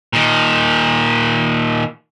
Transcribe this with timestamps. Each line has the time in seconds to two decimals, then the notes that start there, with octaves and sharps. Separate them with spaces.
0.13 A#2 D#3